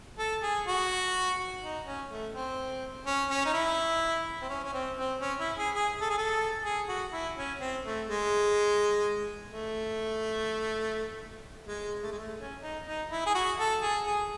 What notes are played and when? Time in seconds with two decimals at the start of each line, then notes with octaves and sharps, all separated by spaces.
0.19 A4
0.43 G#4
0.67 F#4
1.63 D#4
1.86 C#4
2.10 A3
2.34 C4
3.06 C#4
3.30 C#4
3.45 D#4
3.54 E4
4.42 C4
4.49 C#4
4.64 C#4
4.73 C4
4.97 C4
5.21 C#4
5.39 E4
5.57 G#4
5.75 G#4
6.01 A4
6.10 G#4
6.18 A4
6.65 G#4
6.89 F#4
7.13 E4
7.37 C#4
7.61 C4
7.85 A3
8.09 G#3
9.52 A3
11.67 G#3
12.03 A3
12.11 G#3
12.18 A3
12.39 C#4
12.63 D#4
12.87 D#4
13.11 E4
13.26 G#4
13.34 F#4
13.59 A4
13.82 G#4
14.07 G#4